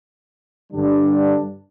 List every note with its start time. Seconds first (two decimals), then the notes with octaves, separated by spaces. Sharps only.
0.72 G2 D3 G3 D4